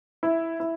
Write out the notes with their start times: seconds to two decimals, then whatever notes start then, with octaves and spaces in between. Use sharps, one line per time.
0.23 E4
0.60 E4